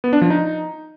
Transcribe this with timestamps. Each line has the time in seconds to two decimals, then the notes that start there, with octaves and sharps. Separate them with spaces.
0.04 B3
0.13 D4
0.22 F3
0.30 D#4